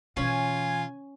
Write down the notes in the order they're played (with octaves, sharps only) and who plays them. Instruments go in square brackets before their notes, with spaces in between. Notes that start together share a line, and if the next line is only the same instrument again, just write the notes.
[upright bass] B2 E3 [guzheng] C#4 B5 [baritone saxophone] F4 [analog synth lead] G#5